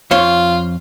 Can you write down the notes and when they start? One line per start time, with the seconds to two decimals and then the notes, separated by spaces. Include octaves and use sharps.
0.11 F2 F4 C#5 C6